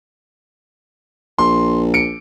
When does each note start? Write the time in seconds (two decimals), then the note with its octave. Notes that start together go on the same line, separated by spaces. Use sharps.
1.39 A#1 C6
1.94 C#7 D7